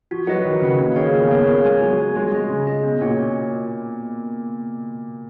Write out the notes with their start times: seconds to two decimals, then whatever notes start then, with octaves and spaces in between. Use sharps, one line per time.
0.11 F3 F#4
0.27 F#3 B4 D#5 F#5
0.44 D#3 F#4
0.61 C#3 B4 D#5 F#5
0.79 C#3 A#3
0.96 D#3 C#4 G#4 C#5 F5
1.13 F3 A#3
1.22 B3
1.30 A#3 C#4 G#4 C#5 F5
1.39 B3
1.47 A#3 G#4
1.64 G#3 C#5 G#5
1.81 F#3 G#4
1.98 C#5 G#5
2.16 G#3 F4
2.32 G#3 G#4 D#5
2.49 C#3 F4
2.67 G#4 D#5
2.83 B2 C#4
3.00 A#2 F#4 C#5 F#5
3.18 C#4